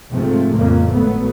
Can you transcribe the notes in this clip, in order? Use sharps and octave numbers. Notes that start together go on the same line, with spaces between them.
G#2 C3 F3 G#3 A3 C4
F2 A2 C#3 A#3
G#1 F#3 A3 B3